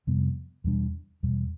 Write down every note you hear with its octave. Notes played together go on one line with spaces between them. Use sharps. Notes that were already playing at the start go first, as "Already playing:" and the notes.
F2 C3 G3 B3
E2 B2 G3 D4
E2 B2 G3